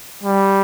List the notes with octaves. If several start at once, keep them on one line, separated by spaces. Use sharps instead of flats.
G3